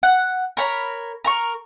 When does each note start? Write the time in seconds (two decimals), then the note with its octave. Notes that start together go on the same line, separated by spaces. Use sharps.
0.03 F#5
0.57 A#4 C#5 A#5 B5
1.25 A#4 A#5 C#6